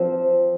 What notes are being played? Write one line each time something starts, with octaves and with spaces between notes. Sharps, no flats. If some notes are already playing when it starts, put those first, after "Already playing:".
Already playing: F3 C4